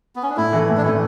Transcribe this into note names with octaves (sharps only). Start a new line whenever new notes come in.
B3
C#4
D4
A2 E4
E3 A3
A2
D4
E3 A3 E4